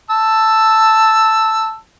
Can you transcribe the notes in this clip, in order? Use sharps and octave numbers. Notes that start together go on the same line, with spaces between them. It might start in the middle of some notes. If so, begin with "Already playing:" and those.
A5 E6